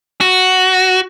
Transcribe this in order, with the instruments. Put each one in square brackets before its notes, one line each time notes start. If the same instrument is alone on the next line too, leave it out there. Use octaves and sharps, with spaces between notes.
[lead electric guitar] F#4